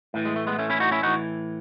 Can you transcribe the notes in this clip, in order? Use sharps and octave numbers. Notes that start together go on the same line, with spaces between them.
A2 E3
G#3
A3
G#3 B3
A3 C#4
C#4 E4
D#4 F#4
C#4 E4
A2 E3 D#4 F#4